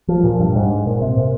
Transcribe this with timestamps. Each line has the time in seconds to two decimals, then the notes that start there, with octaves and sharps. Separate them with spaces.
0.08 F3
0.24 A#2
0.40 G2
0.56 G#2
0.87 A#2
1.01 C3
1.18 A#2